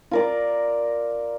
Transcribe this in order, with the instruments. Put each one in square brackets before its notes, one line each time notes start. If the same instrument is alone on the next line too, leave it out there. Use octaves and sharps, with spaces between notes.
[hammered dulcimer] F4 A#4 D5